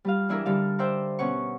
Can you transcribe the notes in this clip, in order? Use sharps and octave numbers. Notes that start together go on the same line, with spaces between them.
G3 F4 F5
E3 D4 E4 G#4 A#4
D3 G3 F5
A#4 C5 D5 E5 G5
B2 C#4 F#5 C#6